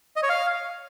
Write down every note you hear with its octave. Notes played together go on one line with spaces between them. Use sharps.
D#5
C#5
F5